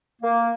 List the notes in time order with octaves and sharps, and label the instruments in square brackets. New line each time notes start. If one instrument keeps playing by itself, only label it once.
[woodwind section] A#3